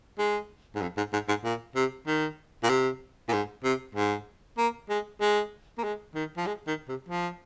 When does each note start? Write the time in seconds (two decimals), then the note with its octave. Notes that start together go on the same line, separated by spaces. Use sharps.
0.19 G#3
0.75 G#2
0.82 F2
0.97 G#2
1.13 G#2
1.29 G#2
1.44 A#2
1.75 C3
2.07 D#3
2.63 A#2
2.69 C3
3.29 A#2
3.33 G#2
3.64 C3
3.95 G#2
4.58 A#3
4.90 G#3
5.21 G#3
5.78 A#3
5.84 G#3
6.15 D#3
6.37 F3
6.46 G#3
6.67 D#3
6.89 C3
7.09 F3